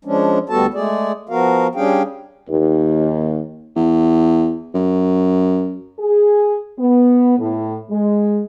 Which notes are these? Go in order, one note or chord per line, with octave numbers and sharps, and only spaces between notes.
F3 G#3 C#4 D4
D2 G3 B3 F#4 A4 A5
G#3 A3 G#4 D5
F3 B3 F#4 A#4 F5
G3 C#4 D4 G#4 F5 G5
D#2
E2
F#2
G#4
B3
A2
G#3